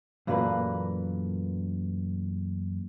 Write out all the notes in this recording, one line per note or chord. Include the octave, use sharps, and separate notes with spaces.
F#2 A#2 E3 A3 A#3 B4